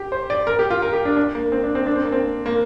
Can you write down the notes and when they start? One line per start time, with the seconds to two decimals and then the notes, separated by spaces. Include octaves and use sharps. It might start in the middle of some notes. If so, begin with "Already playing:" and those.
Already playing: G4
0.12 C5
0.30 D5
0.47 A#4
0.59 G4
0.70 F4
0.82 A#4
0.93 G4
1.05 D4
1.17 D4
1.35 A#3
1.52 C4
1.63 D4
1.75 C4
1.86 D4
1.96 C4
2.05 A#3
2.12 C4
2.46 A#3